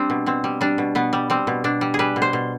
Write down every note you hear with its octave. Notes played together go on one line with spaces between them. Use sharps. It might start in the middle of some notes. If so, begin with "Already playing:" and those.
Already playing: G3 C4 D4
B2
B2 C4
G3
G3 D4
B2
B2 B3
G3
G3 C4
B2
B2 D4
G3
G#4
G3 B4
B2
C5
B2